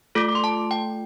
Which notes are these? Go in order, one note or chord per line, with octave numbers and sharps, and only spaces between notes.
A3 F4 A4 D6
D6
C6
A5
G5